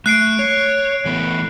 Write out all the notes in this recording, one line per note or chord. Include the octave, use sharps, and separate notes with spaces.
A3 F#6 C7 D7
C#5
E3 A3 B3